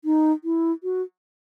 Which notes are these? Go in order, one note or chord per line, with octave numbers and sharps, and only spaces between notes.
D#4
E4
F#4